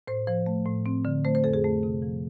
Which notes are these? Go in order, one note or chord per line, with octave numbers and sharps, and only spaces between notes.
A2 C5
F3 C5
A3
A2
C4
D3
A3 C5
C5
F2 A4
G#4
A3
C3
F3